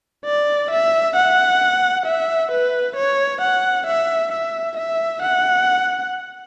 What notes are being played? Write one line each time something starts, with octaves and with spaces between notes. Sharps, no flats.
D5
E5
F#5
E5
B4
C#5
F#5
E5
E5
E5
F#5